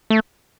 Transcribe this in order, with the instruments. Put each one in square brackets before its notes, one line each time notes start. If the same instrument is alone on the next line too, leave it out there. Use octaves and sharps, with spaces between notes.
[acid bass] A3